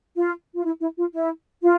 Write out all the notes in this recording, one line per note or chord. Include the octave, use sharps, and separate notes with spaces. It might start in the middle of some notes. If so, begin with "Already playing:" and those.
F4
F4
E4
E4
F4
E4
F4